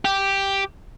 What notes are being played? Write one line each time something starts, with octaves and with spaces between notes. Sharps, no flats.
G4